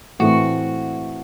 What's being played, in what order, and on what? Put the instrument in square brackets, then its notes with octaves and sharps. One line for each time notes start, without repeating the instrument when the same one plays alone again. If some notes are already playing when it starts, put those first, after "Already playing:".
[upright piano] A2 E3 A3 C4 [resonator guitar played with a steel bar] F#4